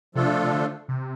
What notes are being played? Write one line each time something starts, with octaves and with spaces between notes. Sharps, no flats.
C3 F3 A3 D4 F4 A4
C3
D3
C3